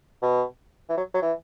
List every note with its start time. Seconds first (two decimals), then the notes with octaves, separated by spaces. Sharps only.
0.22 B2
0.89 E3
0.97 F#3
1.14 F#3
1.22 E3